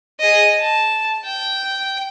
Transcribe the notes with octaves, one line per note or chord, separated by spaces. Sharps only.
G#4 D#5
A5
G5